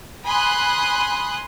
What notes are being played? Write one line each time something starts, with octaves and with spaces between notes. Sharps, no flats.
G#5 B5 C6 D#6 F#6